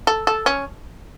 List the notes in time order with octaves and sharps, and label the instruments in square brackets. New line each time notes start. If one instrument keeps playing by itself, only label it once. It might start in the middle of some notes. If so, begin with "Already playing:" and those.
[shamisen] A4
A4
C#4